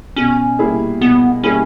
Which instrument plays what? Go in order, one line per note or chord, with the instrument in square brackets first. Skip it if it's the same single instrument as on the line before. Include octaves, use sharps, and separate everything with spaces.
[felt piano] B2 [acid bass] C#4
[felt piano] G3 A#3 E4 G#4
[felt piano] B2 [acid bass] B3
[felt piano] G3 A#3 E4 G#4 [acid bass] C#4